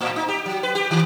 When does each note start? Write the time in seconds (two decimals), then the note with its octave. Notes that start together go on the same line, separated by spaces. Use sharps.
0.01 A2
0.16 D#4
0.29 G4
0.46 F#3
0.63 B4
0.75 G4
0.91 D#3